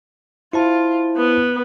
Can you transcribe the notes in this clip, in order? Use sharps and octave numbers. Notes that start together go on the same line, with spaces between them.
E4 F4 C5 A5
B3